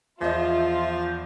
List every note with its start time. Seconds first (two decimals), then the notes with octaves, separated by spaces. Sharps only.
0.21 E2 F3 F4 C5 D#5 E5